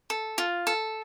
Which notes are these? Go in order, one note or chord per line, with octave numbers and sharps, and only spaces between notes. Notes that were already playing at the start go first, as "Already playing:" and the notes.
A4
F4
A4